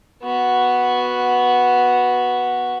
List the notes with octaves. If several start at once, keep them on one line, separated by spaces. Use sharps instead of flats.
B3 F#4